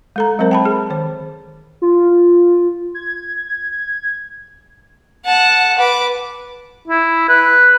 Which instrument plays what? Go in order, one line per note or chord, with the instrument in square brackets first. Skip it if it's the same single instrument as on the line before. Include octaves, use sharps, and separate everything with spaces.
[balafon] G#3 A4 A#5
F#3 G#3 C4 A#4 C5
G5 A5 B5
G#4
D#3 C5
[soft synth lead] F4
G#6
[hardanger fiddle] F#5 A5
B4 D6
[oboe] E4
B4